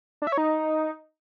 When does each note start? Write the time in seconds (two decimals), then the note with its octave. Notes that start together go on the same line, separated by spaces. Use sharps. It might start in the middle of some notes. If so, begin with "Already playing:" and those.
0.22 D4
0.27 E5
0.32 C#5
0.38 D#4